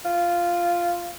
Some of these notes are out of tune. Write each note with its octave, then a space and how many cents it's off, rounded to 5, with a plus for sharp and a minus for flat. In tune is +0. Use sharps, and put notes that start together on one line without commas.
F4 -5